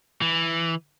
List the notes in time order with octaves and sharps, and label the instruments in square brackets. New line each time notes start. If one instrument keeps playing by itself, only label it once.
[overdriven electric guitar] E3